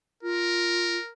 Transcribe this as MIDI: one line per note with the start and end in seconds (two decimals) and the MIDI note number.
0.23 0.97 65
0.23 1.12 70